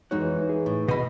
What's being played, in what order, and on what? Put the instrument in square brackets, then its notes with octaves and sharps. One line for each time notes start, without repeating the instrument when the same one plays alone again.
[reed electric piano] F2 G#3 C#5 [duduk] E3 [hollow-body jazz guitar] D#4 F#4
[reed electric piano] G#4
[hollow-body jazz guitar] A2
[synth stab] B2 [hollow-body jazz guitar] D#5 B5